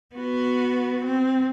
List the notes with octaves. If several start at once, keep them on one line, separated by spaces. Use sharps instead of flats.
B3 F#4
C4